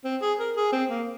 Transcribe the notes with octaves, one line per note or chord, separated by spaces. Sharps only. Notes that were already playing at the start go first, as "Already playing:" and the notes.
C4
G#4
A#4
G#4
C4
A#3